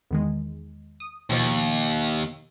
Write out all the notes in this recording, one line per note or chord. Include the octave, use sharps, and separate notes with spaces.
E2 D#3 G#3
D#6
D#2 B2 F3 C#5